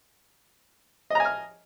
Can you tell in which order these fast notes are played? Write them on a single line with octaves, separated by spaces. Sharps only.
D#5 A#5 G#5 F6